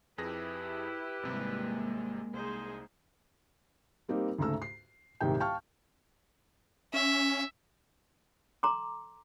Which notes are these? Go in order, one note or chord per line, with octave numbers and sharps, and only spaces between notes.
F2 E4 G4 G#4 B4 A#6
G#1 C3 G3 G#3 A#3
C2 D#4 G#4 C5
G3 A#3 C4 D#4 G4
D2 G#2 C#3 A3 A#5 E6
C7
D#1 C2 G#2 D#3 G5
F5 G5 A5 C#6 F6
C#4 E5
A4 A#5 C6 D6